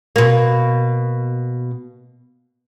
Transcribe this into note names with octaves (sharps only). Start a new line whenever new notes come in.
B2 A#3